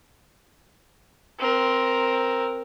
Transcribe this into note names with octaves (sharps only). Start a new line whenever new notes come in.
C4 A#4